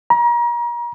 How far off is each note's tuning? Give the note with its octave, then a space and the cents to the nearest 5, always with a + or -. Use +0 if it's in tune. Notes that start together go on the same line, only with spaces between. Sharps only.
A#5 +35